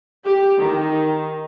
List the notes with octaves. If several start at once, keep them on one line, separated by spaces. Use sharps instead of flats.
G4
D#3